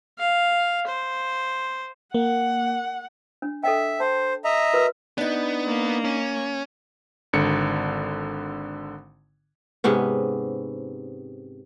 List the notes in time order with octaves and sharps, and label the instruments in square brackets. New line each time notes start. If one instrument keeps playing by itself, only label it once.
[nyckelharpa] F5
C5
[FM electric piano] A#3 [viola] F#5
[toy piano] D4
[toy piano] A4 D#5 G5 [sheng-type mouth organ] E5
[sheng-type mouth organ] C5 [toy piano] A5
[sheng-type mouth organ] D#5 E5 A#5
[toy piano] F#4 A#4 B4
[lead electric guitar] B3 [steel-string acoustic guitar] D4 D#4
[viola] A#3
[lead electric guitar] C#4
[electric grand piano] G#1 D3 C#7
[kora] G#2 C3 B3 C#4